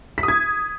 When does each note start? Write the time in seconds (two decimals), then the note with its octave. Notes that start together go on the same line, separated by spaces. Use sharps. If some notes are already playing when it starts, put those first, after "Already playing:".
0.18 B6
0.23 D#6
0.28 G#6